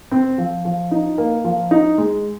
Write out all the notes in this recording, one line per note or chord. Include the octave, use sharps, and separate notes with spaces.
C4
F3
F3
D#4
A#3
F3
D#4
G#3